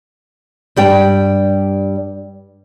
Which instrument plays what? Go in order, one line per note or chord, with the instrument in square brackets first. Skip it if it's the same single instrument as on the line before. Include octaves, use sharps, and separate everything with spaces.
[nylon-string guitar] G2 G3 G5